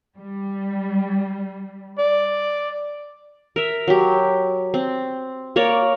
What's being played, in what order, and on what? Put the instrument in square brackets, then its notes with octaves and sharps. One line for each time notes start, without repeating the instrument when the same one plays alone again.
[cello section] G3
[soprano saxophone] D5
[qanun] A#4 E5
F#3 G4
C4
A#3 A#4 C#5 D5